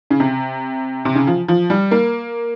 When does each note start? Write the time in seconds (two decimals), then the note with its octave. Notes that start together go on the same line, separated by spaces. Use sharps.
0.11 C#3
0.20 C3
1.05 C3
1.15 C#3
1.27 F3
1.48 F3
1.70 G3
1.91 A#3